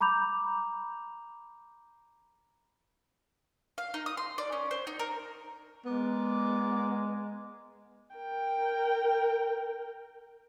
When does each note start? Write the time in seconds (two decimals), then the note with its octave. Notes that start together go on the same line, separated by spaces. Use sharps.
0.01 A#5 B5 D6 G6 F7
3.78 F5
3.94 D#4
4.06 D#6
4.17 C6
4.38 D5
4.52 C#4
4.71 C5
4.87 D#4
4.99 A#4
5.85 G#3 B3 A#4 D5 D6
8.16 A#4 G5